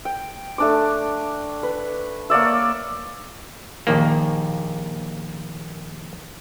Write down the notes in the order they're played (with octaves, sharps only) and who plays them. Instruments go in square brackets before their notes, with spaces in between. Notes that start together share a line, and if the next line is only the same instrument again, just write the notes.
[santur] G5
A3 D4 D6
B4
A#3 C#5 D5 E5
[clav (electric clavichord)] A#1 D#2 A#3